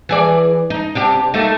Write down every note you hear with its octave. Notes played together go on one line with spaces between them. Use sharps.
E3 G#4 D5
D#4
C3 D4 G4
A3 A#3 D#4